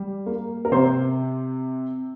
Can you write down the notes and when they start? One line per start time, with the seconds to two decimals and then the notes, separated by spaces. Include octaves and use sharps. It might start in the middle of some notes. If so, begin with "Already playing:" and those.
Already playing: G3
0.26 A#3
0.65 A#4
0.72 C3 C5